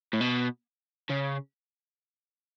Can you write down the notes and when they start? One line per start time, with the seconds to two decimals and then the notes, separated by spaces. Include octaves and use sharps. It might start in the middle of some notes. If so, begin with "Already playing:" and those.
0.13 A2
0.21 B2
1.09 C#3